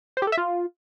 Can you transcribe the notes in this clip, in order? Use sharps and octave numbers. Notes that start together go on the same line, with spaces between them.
C5
G4
A4
E5
F4